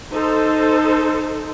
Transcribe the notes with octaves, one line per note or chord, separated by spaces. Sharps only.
D#4 A4 C5